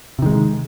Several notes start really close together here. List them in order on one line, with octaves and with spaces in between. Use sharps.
C3 D#3 G#3